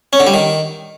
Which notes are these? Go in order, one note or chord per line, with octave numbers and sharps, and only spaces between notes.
C#4
D3
G3
D#3